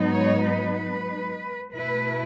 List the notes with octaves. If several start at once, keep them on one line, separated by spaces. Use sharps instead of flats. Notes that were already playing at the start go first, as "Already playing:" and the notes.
Already playing: G#2 F#3 B3 D#4
C#5
B4
B2 A3 E4 B4